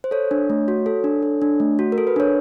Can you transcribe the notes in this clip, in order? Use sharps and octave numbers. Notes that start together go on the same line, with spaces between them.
C5
A4 C#5
D4
A3
F#4
A4
D4
A4
D4
A3
F#4
A#4
A4
B4
D4 C#5